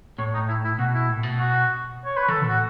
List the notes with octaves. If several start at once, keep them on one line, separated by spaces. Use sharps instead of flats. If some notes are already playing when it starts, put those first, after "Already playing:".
A2 C#5
D#4
E4
E4
B2 F#4
E4
A2
B2
F#4
C#5
B4
E3 A4
A2 F#4